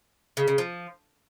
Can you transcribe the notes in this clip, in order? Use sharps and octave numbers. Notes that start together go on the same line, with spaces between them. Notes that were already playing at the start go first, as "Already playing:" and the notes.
C#3
C#3
F3